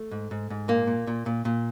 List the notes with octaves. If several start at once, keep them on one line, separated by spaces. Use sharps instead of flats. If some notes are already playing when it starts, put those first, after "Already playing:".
Already playing: A3
G#2
G#2
G#2
A#2 A#3
A#2
A#2
A#2
A#2